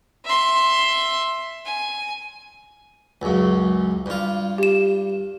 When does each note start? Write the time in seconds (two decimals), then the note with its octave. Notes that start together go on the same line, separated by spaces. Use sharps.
0.25 E5 C6
1.65 G#5
3.22 C#2 F#2
4.06 G2 F4
4.58 G4 E7